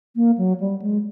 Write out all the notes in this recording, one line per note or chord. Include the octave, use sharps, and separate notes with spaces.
A#3
F#3
G3
G#3